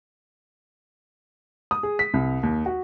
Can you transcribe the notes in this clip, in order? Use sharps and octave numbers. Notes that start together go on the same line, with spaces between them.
D#6
G#4
B6
C2
D#2
F#4